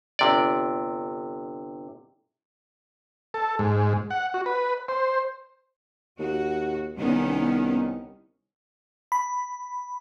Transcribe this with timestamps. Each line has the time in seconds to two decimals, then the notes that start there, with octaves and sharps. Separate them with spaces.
0.19 G1 C3 D5
3.34 A4
3.59 G#2
4.10 F#5
4.34 F#4
4.46 B4
4.88 C5
6.19 D#2 F#4
6.97 C2 D#3 B3 C#4
9.12 B5